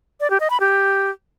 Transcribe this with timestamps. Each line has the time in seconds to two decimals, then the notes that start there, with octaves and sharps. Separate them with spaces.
0.20 D5
0.30 G4
0.40 D#5
0.50 B5
0.60 G4